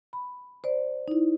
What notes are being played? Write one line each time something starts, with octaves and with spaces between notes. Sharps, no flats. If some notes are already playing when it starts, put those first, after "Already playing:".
B5
C5 D5
D#4 E4